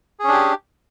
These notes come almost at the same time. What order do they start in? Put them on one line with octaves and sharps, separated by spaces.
G#4 C#4 D4 G4